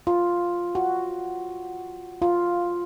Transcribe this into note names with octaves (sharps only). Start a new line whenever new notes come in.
F4
F#4
F4